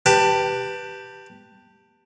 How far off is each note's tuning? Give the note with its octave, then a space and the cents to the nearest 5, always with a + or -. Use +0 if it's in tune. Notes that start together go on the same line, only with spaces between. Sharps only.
G4 +0 B4 +0 A5 +25